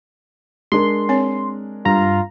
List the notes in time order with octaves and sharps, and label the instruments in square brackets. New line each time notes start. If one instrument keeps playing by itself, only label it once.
[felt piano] G#3 D4 A#4 [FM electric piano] C6
[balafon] C4 C#5
[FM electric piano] G2 A#5 [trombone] F4